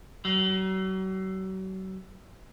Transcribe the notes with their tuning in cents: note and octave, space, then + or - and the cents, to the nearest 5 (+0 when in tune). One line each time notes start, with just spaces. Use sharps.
F#3 +40